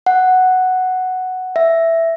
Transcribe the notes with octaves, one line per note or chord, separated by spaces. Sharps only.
F#5
E5